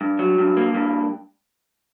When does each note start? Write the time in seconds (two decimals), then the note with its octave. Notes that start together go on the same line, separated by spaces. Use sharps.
0.01 G2
0.19 F#3
0.38 G2
0.57 A#3
0.74 G2